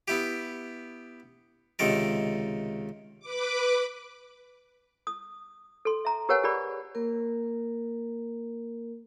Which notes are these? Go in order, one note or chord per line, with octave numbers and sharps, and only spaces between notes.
B3 E4 G4
C#2 C3 D#3 A4 A#4
B4 D6
D#6
A4 C6
E5 A#5
G4 A#4 B4 C#5 F#5 G#5
G4 G#4 A#4 D5 B5
A#3 A#4